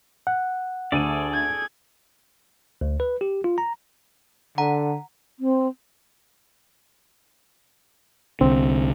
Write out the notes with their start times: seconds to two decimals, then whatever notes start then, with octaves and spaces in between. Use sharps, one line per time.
0.27 F#5
0.92 D2 G#4 A4 D5 D#7
1.33 G#6
2.81 D2
3.00 B4
3.21 G4
3.44 F4
3.58 A#5
4.58 D3 F#5 A#5
5.40 C4
8.41 C2 D3 C4